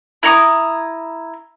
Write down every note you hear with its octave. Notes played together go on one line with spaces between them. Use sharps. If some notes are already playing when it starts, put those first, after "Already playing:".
E4 A#5 C#6 D#6